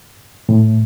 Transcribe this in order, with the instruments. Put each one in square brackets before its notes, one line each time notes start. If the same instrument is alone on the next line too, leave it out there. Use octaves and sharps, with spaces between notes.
[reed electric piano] A2